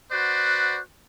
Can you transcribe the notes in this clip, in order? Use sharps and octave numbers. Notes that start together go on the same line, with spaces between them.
F#4 B4 C5 D5 F#5